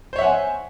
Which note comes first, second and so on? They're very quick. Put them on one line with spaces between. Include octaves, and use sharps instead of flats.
C5 C#5 E5 F#5 G#5